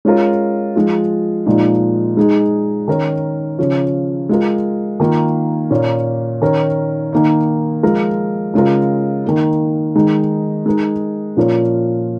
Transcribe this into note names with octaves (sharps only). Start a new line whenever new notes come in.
G#3 C#4 F4 A#4
F3 G#3 F4
A#2 F3 G#3 D#4
G#3 D#4 G#4
D#3 C#4 A#4
C#3 F3 C#4
G#3 F4 A#4
D#3 A#3 F4
A#2 A#3 C#4
D#3 C#4 A#4
D#3 A#3 D#4
F3 G#3 F4 A#4
C#3 G#3 F4 A#4
D#3 A#3 D#4
D#3 G#3 D#4
G#3 D#4 A#4
A#2 F3 C#4 A#4